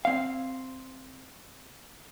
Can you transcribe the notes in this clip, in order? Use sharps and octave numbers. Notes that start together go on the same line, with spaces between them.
C4 F5